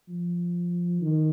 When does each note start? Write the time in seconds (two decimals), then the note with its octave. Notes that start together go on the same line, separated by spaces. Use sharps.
0.09 F3
1.01 D#3